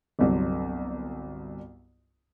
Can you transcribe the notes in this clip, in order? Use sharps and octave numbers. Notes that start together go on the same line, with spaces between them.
G1 C2 F#3